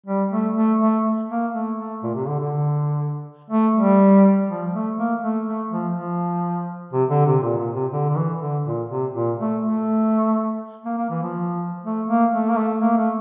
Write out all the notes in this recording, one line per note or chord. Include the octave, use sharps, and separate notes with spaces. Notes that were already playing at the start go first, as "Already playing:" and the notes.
G3
A3
A3
A3
A#3
A3
A3
A#2
C3
D3
D3
A3
G3
F3
A3
A#3
A3
A3
F3
F3
C3
D3
C3
A#2
A#2
C3
D3
D3
E3
D3
A#2
C3
A#2
A3
A3
A#3
A#3
E3
F3
A3
A#3
A3
A#3
A3
A#3
A3